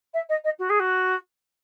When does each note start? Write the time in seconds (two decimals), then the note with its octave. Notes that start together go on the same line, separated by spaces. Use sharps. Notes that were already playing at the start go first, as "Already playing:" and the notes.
0.13 E5
0.29 D#5
0.44 D#5
0.59 F#4
0.69 G#4
0.79 F#4